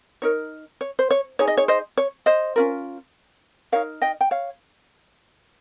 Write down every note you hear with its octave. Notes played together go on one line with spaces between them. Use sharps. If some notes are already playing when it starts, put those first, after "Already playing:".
D#4 A#4 C#5
C#5
C5
C#5
D#4 G#4 C#5
D#5
C#5
C5 D#5
C#5
C5 D#5
C#4 F4 A#4
D#4 G4 A#4 C#5 F5
D#5 G5
G5
C#5 F5